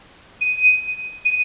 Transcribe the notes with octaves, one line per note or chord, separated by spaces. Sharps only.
D#7
D#7